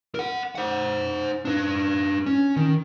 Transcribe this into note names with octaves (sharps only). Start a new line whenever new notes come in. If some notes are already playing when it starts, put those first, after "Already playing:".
A#4 F#5
C5 F#5
D4 B4
C#4
D#3